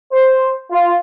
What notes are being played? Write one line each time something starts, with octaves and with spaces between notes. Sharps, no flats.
C5
F4